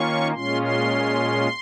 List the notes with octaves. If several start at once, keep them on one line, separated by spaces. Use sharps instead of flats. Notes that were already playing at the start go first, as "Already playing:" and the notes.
Already playing: D#3 A#3 C#4 F4 C#6
A#2 G#3 C#4 F4 C6
C6